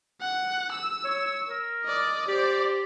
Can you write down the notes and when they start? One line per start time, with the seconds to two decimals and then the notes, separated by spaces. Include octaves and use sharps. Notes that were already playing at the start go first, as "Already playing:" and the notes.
0.21 F#5
0.72 E6
1.04 C#5
1.48 A#4
1.84 D5 D#5
2.28 G4 C5 D5